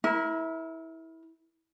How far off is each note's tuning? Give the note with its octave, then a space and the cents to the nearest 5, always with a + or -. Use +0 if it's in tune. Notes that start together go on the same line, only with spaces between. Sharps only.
E4 -20 A#4 +20